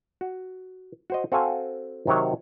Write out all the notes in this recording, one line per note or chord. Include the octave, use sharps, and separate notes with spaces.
F#4
F#4 C5 D#5
C4 F#4 A4 F5 G#5
C3 D#3 F#3 C#5 F#5